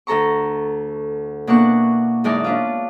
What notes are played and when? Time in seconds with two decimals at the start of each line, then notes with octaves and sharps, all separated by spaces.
0.07 D2 A4 A#5 C#6
1.47 B2 A#3 D4 E4 F#5 C#6
2.24 F#2 E3 G#3 D#4 D5 A5
2.44 C#4 D4 F4